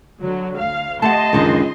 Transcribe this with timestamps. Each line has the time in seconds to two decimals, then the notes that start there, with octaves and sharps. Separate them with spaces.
0.21 D3 F#3
0.58 D2 F5
1.02 A3 G4 D#5 F#5 A5 C6
1.33 C#2 F#2 D3 D#3